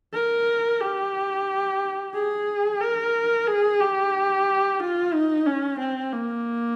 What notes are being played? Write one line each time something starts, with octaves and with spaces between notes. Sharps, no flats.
A#4
G4
G#4
A#4
G#4
G4
F4
D#4
C#4
C4
A#3